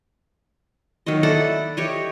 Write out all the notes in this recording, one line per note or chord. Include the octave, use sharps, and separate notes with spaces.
D#3 F#3 C#5 D#5
E4 A4 D5 F#5
G4 C#5 D#5